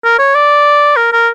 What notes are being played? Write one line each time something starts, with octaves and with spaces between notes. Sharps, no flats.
A#4
C#5
D5
A#4
A#4